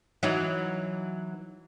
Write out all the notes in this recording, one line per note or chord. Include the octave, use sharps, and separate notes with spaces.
E3 F#3 D#4